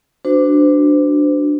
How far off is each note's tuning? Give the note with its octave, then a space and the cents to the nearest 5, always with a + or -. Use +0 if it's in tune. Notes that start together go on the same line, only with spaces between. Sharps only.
D4 +0 F#4 +0 C5 -35